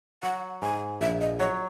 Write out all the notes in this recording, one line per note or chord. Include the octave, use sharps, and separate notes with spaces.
F#3 F#5
G#2 G#5
A#1 E5
D#5
F#3 C#5